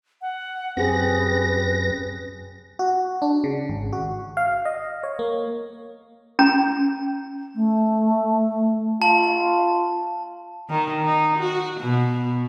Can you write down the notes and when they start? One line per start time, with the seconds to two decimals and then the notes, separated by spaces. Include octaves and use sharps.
0.22 F#5
0.77 F#2 C4 G4 G#4 B4 A#6
2.79 F#4
3.22 D4
3.44 C#3
3.70 G#1
3.93 F#4
4.37 F5
4.65 D#5
5.03 C#5
5.19 A#3
6.39 C#4 A#5
7.55 A3
9.02 F4 A5
10.70 D#3
11.03 D#4
11.38 F#4
11.80 B2